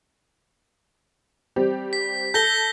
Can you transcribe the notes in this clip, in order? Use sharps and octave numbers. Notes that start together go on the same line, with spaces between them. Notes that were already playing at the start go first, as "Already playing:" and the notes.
G3 C4 G4
B6
A4 G6 A#6 G7